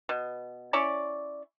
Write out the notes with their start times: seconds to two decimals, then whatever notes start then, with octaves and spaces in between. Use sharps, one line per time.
0.09 B2
0.73 C#4 E4 C#5 D5